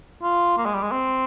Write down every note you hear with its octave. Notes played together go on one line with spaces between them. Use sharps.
F4
A#3
G#3
G3
G#3
C4